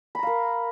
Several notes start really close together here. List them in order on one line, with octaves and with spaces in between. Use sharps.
B5 A#5 F5 A#4